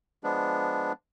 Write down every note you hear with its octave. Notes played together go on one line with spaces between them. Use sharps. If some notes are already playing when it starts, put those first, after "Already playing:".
F3 G#3 B3 D4